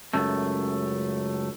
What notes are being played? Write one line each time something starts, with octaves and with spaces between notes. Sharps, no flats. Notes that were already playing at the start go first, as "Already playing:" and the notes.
C#2 F#2 A3